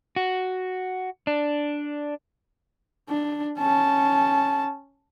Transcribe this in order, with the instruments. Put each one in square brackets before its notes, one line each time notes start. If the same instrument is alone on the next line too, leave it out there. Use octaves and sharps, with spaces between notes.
[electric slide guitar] F#4
D4
[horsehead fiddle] D4
C#4 A5